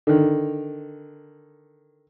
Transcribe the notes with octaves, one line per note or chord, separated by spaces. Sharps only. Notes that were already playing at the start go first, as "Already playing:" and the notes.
D3 D#3